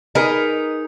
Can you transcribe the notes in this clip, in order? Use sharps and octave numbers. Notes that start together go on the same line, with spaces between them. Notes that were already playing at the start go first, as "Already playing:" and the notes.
D#4 G#4 A#4 B4 D#5